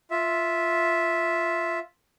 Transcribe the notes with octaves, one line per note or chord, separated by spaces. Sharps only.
F4 E5